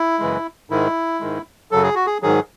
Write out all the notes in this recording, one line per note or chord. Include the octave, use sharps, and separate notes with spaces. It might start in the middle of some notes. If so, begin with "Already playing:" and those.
Already playing: E4
F#2 C#3 E3 G#3
G#2 D#3 G#3 E4
G#2 D#3 G#3
F#2 C#3 F#3 A4
G#4
F#4
G#4
G#2 D#3 F#3 G#4